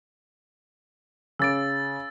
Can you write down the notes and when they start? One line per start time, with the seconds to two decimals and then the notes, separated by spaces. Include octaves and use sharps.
1.39 C#3 D6 E6 A6 D7